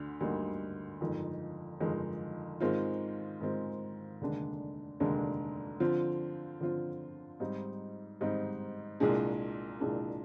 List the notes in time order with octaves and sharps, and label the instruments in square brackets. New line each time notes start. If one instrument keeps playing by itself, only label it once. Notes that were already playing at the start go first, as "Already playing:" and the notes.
Already playing: [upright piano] D2 D3
D2 D3 G3 A#3 D#4
G1 F2 D#3 G#3 D#4
G1 F2 D#3 G#3 D#4
G#2 D#3 G#3 C4 F4
G#2 D#3 G#3 C4 F4
F1 D#2 D3 G#3 D4
F1 D#2 D3 G#3 D4
D3 F3 C4 F4
D3 F3 C4 F4
G#2 G3 C4 D#4
G#2 G3 C4 D#4
C2 A#2 G#3 D4 G#4
C2 A#2 G#3 D4 G#4